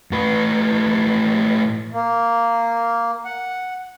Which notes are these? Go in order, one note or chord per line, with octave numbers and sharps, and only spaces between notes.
A2 B4
A#3
F#5